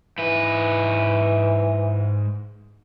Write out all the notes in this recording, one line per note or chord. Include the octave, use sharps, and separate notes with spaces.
G#2 E3 B4